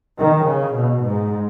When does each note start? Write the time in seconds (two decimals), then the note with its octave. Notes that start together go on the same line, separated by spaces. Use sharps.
0.18 D#3
0.47 C#3
0.76 B2
1.05 G#2